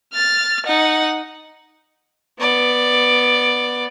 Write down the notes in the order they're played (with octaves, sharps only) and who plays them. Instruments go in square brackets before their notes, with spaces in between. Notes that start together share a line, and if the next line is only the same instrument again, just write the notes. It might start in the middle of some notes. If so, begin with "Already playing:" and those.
[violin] F6 A6
D#4 F#5
[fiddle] B3 D5